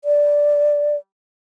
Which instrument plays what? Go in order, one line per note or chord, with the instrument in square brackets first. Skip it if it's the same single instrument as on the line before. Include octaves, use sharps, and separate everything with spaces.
[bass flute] D5